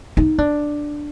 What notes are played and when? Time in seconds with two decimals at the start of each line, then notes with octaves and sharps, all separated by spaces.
0.17 D#4
0.38 D4